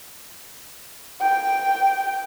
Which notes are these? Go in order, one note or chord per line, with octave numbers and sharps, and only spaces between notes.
G5